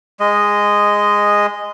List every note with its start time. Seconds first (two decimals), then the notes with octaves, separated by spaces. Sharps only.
0.20 G#3 D#5